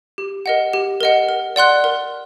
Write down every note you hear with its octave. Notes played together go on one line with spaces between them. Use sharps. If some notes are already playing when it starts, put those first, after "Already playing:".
G4
A#4 D#5 F#5
G4
A#4 D#5 F#5
A#4
D5 F#5 C6 F#6
A#4